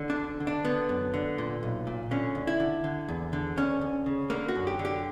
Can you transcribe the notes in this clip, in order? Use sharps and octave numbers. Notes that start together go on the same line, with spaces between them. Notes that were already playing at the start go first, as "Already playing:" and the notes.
Already playing: D3
D4
D2
D3
D4
D3 B3
F#2
D3
A#2
B1
A#2
D3 C#4
D2
E4
D3
D3
E2
D3
D2 C#4
D2
C#3
D3 A#3
F#4
F#2
G4
D3
G4